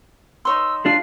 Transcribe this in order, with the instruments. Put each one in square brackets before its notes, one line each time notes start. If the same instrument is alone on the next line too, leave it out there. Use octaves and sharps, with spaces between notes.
[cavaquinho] D#4 C#5 C6 [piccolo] E6
[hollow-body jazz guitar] G#3 D4 F4 [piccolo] C7